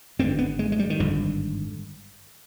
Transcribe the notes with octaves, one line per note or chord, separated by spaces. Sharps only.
G#1 G2 D3 C4
B3
G#3
G#3
G3
D#3
G#1 G2 D3 F3